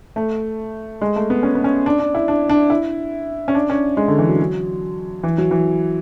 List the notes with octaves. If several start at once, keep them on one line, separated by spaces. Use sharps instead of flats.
A3
G#3
A3
B3
C#4
B3
C#4
D4
D4
E4
D4
D4
E4
C#4
D4
C#4
G#3
D3
E3
F#3
F#3
E3
F#3
E3